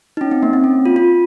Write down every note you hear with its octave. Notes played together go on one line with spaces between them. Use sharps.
D#4
C#4
C4
A#3
C4
C#4
F4
F4